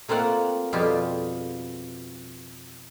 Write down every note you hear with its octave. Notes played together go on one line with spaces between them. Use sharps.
A3 A#3 C4 F4 F#5
F2 B2 G3 F4 G4 G#4